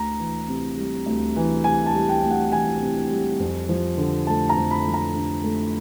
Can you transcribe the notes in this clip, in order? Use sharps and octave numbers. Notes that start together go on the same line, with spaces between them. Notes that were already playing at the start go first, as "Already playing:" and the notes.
Already playing: D2 A#5
E3
C3
G3
D2
E3
C3 G#5
A5
G3
G5
D2
F#5
E3 G#5
C3
G3
F2
F3
D3
A3 A5
A#5
F2
B5
F3
A#5
D3
A3